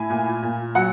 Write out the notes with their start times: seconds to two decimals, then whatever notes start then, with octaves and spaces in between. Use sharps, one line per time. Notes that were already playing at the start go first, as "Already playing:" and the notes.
Already playing: A2 G#5
0.10 A#2
0.42 A#2
0.75 F#3 F#5